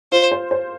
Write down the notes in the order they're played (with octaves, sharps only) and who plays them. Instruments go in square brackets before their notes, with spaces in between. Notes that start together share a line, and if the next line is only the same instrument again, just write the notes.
[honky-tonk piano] F4 [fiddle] C5
[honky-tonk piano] C5
C5